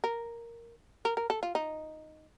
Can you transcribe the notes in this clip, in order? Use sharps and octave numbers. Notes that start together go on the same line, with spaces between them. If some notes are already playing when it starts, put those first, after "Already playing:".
A#4
A#4
A#4
A4
F4
D#4